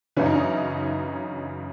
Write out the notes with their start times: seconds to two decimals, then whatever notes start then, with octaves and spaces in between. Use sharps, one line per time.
0.16 F#2 C#3 E3 C#4
0.26 D#4
0.35 C#4